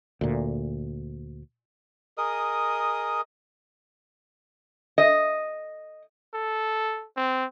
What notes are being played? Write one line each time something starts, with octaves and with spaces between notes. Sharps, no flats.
D2 A#2
G#4 A#4 D#5 D#6
D#5
A4
C4